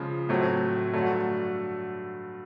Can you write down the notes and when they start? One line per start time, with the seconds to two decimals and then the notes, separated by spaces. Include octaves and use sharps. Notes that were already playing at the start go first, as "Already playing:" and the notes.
Already playing: C#3 F3 G#3
0.29 A2 F#3 A3 C4
0.93 G2 D3 F#3 A3